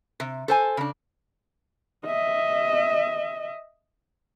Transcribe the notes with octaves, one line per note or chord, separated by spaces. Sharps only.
C3
A4 C5 G#5
C#3 D4
D#5 E5